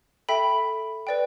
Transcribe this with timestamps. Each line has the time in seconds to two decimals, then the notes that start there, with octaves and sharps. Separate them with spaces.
0.29 A4 E5 G5 B5
1.07 B4 D5 G5